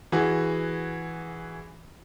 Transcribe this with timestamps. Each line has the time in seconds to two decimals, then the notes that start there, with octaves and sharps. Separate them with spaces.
0.12 E3 F#4 G#4